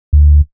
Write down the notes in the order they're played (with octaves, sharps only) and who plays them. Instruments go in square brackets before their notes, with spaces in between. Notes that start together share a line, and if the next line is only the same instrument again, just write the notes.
[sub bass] D2